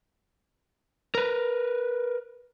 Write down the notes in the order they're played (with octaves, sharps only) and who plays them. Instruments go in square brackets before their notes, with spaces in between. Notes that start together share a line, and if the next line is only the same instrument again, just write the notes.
[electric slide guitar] A#4 B4